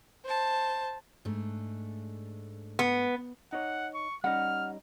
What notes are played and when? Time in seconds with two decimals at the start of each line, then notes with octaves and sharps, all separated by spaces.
0.25 C5 A5
1.25 G#2 A3 D4
2.79 B3
3.53 D#4 C#5 F#5
3.94 C#6
4.24 G3 C#4 D#4 F#5 F6